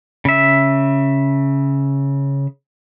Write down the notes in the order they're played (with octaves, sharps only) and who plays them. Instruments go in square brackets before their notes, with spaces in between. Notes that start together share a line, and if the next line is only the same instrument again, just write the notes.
[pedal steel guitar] C#3 E5